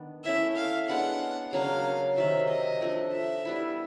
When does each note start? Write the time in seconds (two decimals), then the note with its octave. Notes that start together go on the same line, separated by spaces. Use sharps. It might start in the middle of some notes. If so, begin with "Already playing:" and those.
Already playing: D#3 B3 D4
0.24 A3 C#4 E4 E5
0.56 F5
0.89 G#3 B3 D4 F#5
1.52 C#3 F#3 A#3 D4 F5
2.17 C3 D#3 F#3 E5
2.49 D#5
2.81 F3 A3 D4
3.13 E5
3.45 G3 B3 E4